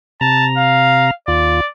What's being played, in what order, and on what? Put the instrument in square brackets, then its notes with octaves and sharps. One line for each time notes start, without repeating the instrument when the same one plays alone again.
[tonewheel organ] C3 A#5 [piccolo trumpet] A5
[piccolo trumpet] F5
[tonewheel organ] D#2 F4 [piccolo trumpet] D5